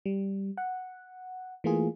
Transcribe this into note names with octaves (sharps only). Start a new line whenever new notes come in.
G3
F#5
E3 A3 A#3 F4 G#4